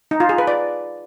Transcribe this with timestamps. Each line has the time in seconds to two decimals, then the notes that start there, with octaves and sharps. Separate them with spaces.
0.11 D#4
0.20 F4
0.29 G#4
0.38 B4
0.47 D5